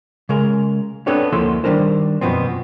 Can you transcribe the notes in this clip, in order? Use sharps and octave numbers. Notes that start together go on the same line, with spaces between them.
C#3 G#3 A#4
B3 C4 D4 A4 B4 C#5
D2 F3 A#3 E4 A4 C6
D#3 G3 D4 A#4 C5
F#2 B2 E3 F3 B3 C4